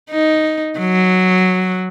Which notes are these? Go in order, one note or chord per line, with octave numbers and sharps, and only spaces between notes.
D#4
F#3